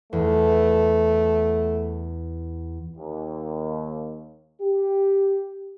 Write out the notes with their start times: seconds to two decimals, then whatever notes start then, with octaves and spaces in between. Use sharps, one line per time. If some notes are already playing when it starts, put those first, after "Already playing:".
0.13 E2 A3
2.97 D#2
4.62 G4